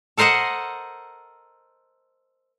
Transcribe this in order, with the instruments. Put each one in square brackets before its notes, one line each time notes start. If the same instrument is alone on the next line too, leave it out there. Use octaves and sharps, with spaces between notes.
[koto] A4 A#4 C5 D#5 F#5